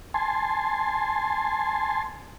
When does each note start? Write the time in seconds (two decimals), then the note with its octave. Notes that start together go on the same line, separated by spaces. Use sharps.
0.14 G#5 A5 C6